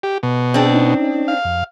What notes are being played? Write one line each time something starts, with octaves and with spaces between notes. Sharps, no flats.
G4
B2
C4 D4 G#4 G5
C#4 D#4
F5
F2